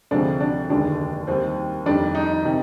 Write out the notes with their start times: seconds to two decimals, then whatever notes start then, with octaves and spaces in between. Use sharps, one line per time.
0.11 D2 C3 F3 G#3 D4
0.40 D4
0.69 F1 D#2 D3 G#3 D4
1.27 D#2 D#3 G3 C4
1.86 F2 D#3 G3 D4
2.15 D#4
2.45 C3 D#3